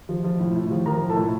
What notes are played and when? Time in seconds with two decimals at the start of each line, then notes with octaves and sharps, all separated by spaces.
0.09 F3
0.24 F3
0.40 A2
0.56 A2
0.71 F3
0.86 F3 A#4 A#5
1.01 A2
1.10 A4 A5
1.17 A2